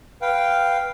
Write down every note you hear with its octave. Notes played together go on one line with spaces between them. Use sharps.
B4 F5 G5